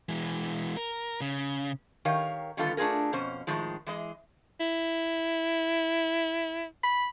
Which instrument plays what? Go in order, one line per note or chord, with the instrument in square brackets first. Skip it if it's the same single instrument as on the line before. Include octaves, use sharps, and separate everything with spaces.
[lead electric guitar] E3 G#3
A#4
C#3
[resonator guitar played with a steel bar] D#3 G4 A#4 C#5 F5
D3 D#3 G3 B3 F4 A4
A3 D4 F4 G#4 A#4
F2 B2 C#4 C5
A2 D#3 F3 G#3
E3 G#3 D#5
[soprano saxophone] E4
B5